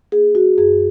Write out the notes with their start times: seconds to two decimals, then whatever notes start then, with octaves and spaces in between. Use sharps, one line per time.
0.12 A#3 G#4
0.35 F#4
0.58 F#2 G#4